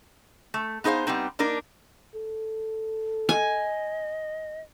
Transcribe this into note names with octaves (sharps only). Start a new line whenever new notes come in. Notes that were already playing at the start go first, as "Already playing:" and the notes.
A3
B3 D#4 G#4 C5 F5
G3 B3 C4 D#4
A#3 D4 D#4 A#4
A4
D#5 G#5